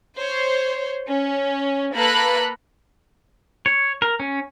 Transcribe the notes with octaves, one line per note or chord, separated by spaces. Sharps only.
C5 C#5
C#4
A#3 A4 B4 A#5 B5 F#6
C#5
A#4
C#4